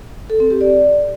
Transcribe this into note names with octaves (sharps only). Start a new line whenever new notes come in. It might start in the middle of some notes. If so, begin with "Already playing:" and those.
A4
C4
G4
D5